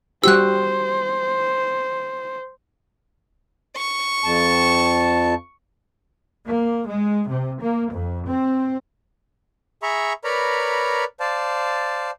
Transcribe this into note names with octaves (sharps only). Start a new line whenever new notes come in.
G3 F#4 G4 C5 E6 F#6
C#6
F2 A5
A#3
G#3
C3
A#3
F2
C4
G#4 E5 A#5 B5 C#6
A#4 B4 C#5 D5 A#5 B5
C5 D5 F5 A5